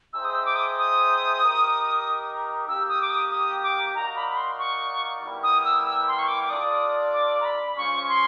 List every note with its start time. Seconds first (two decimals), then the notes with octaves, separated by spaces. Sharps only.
0.13 D#4 G#4 C5 E5 G5 E6
0.25 D#6
0.35 E6
0.46 D6
0.56 D#6
0.77 D#6
1.41 D#4 G4 A#4
2.67 A#3 D#4 G4 E6
2.89 D#6
3.02 D6
3.10 D#6
3.31 D#6
3.63 D6
3.95 D#4 F#4 A#4 D5 F5 A#5
4.16 B5
4.29 B5
4.37 C6
4.59 C#6
5.22 G3 B3 E4 G4 A#4
5.43 D#6
5.65 E6
5.85 E6
6.08 C6
6.19 C#6
6.28 D6
6.44 D6
6.50 D4 F4 A4 D5 D#6
7.13 D6
7.40 A#5
7.45 B5
7.76 G#3 C#4 F4 G#4 C5 C#6
8.09 C6